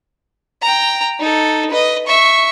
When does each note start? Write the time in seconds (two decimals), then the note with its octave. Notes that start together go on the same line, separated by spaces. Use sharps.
0.62 G5 A#5
1.20 D#4 A4
1.71 B4 D#5
2.07 E5 C#6